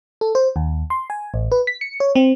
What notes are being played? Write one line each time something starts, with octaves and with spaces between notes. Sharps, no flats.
A4
C5
D#2
C6
G#5
A1
B4
B6
C#7
C#5
C4